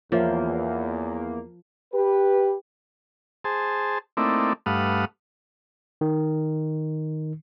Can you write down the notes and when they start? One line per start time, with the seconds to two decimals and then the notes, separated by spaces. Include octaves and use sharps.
0.12 E2 F3 A#3 C#5 E5
1.93 G4 B4
3.44 G#4 C5 A5
4.17 A3 A#3 C4 D#4 E4 D5
4.66 G2 A3 B4 F5 F#5 D#6
6.01 D#3